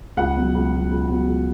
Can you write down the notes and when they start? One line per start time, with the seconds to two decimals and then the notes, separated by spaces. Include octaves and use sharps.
0.17 C#2 F#5
0.36 B2 F#3
0.54 C#2
0.72 B2 F#3
0.90 C#2
1.08 B2 F#3
1.27 C#2